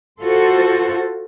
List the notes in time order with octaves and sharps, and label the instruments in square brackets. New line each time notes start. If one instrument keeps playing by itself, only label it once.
[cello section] F4 F#4 A4 C5